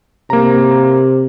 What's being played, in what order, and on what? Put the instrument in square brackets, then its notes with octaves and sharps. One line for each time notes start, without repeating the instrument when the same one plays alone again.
[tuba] C3 [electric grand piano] A#3 A#5